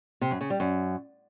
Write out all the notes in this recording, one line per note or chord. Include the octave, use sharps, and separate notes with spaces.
C3
F#2
C#3
G3
F#2